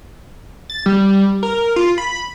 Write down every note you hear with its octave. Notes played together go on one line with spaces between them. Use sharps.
A6
G3
A#4
F4
B5